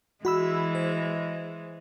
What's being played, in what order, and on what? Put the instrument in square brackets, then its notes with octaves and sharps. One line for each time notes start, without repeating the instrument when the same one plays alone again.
[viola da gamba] E3 G#3 [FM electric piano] F#4 B5 E6
[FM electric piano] C5